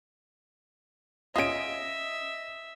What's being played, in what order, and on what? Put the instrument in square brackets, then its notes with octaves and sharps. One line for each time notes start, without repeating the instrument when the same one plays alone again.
[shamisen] C#4 F4 [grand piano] D#5 D7 [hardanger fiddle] E5